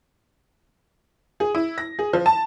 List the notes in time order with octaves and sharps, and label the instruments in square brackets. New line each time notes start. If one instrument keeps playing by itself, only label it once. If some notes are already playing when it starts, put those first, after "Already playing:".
[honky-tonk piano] G#4
E4
A#6
G#4
F3
A5